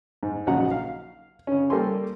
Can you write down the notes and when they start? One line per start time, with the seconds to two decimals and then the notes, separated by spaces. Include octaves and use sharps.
0.23 G#2
0.47 A#1 C#3 F#3 D#4 F#5 A#5
0.71 F5
1.47 C#3 C#4
1.70 G3 A#3 G4 A4 G#5 C6